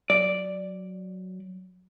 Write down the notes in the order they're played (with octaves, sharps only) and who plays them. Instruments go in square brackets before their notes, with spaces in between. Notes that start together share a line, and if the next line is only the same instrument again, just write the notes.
[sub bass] F#3 [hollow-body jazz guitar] D5